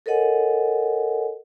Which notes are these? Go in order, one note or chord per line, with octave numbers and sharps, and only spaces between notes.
A4 A#4 C#5 D#5 F#5 G#5